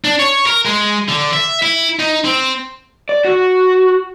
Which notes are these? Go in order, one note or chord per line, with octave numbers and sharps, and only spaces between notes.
D4
C#5
A#4
G#3
D3
E5
E4
D#4
C4
D5
F#4